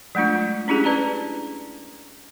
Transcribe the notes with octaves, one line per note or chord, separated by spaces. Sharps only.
F#3 G#3 A3 D4 F4
C#4 D4 E4 G4 G#4
B4 D5 A5 A#5